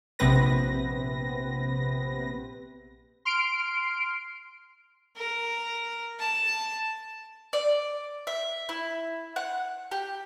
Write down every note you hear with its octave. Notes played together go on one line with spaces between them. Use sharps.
A#1 C3 B3 C4 B4 A#6
C6 F6 C7 D7
A#4
A5
D5
E5
E4
F#5
G4